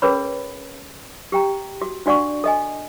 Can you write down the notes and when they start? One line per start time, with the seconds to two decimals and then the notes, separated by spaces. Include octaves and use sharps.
0.02 C#4 G#4 A#4 B4 C#5 B5
1.32 G4 G5 A#5
1.81 F#4
2.06 D4 F#4 D5 F#5 C#6
2.44 A4 D#5 G#5